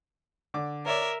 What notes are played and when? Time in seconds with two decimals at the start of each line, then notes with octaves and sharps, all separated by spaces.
0.54 D3 D6
0.86 A#4 C#5 D5 E5